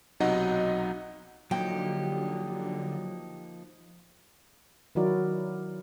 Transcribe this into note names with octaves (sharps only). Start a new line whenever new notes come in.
B1 C3 F#3 D#4 D#5 F#5
D3 F3 F#3 A#3 D#4 G4
D#3 F#3 E4 F#4 A#4 D5